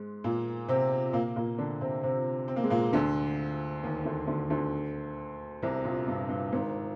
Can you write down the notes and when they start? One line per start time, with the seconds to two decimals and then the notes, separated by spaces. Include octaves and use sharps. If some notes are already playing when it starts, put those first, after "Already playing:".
Already playing: G#2 G#3
0.24 A#2 A#3
0.68 C3 C4
1.13 A#2 A#3
1.36 A#2 A#3
1.58 D3 D4
1.81 C3 C4
2.03 C3 C4
2.48 C4
2.56 A#3
2.64 G#3
2.70 A#2 A#3
2.93 D2 D3
3.83 D#2 D#3
4.05 D2 D3
4.27 D2 D3
4.50 D2 D3
5.62 C2 C3
5.84 A#1 A#2
6.08 G2
6.29 G2
6.53 G#1 G#2